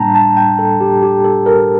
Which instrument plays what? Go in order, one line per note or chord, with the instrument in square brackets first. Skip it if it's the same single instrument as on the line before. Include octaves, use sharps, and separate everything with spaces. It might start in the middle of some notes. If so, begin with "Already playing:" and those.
Already playing: [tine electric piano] A2 G3 A#3 D4 G5 A5 A#5
A5
G5
A4
G4
G4
A4
A#4